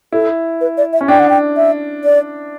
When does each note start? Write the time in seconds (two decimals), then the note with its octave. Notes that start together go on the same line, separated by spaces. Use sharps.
0.12 E4 A4
0.61 B4
0.77 D5
0.93 E5
1.01 C#4
1.08 D4 G5
1.20 F#5
1.30 G5
1.57 E5
2.04 D5